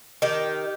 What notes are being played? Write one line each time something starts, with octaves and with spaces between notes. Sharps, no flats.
D#3 G4